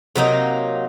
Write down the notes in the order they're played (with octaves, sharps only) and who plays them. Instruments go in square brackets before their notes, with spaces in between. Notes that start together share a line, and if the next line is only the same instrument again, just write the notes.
[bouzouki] C3 F#3 A#3 D#4